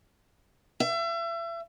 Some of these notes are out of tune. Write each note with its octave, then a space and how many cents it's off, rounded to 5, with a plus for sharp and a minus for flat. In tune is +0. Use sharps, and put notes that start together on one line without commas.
E5 +35